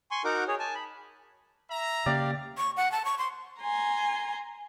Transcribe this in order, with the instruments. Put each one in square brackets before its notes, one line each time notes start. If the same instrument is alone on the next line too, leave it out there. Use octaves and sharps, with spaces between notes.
[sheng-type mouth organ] G#5 C6 C#6
D#4 F#4 A#4 F#5 D6
G#4 C#5
G#5 A5
B5
[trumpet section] E5 A#5
[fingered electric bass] C#3 A#3 [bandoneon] G4 F5 [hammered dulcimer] D5
[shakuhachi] C#6
F#5
A5
C#6
C6
[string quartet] G#5 A#5 C6